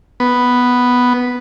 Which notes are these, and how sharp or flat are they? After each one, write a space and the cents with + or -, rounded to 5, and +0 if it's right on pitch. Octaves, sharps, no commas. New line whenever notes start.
B3 +0